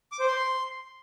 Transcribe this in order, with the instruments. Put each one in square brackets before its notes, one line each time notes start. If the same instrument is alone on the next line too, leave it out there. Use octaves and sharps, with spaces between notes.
[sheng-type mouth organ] D6
C5
C6